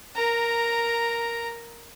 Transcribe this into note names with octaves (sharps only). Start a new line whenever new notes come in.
A#4 A#5